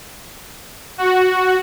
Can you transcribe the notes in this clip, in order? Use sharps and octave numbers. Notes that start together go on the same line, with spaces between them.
F#4